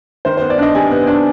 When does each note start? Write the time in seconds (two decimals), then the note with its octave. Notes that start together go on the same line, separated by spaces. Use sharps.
0.25 D#3 C5
0.37 B3 C5
0.50 D5
0.58 D4 D#5
0.75 C3 G#5
0.91 B3
1.07 D4